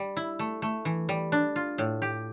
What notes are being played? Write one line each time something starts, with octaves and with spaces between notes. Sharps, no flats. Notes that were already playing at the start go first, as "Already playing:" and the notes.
Already playing: G3
E4
A3
A3
E3
G3
D4
F4
A2
G4